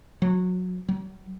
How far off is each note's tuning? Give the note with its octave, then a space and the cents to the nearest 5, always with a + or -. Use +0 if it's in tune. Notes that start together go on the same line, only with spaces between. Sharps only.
F#3 -20
F#3 +35